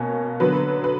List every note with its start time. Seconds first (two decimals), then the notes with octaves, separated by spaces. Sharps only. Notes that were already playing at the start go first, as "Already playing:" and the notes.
Already playing: B2 A#3 C#4
0.40 D3 F#3 B3 B4
0.84 B4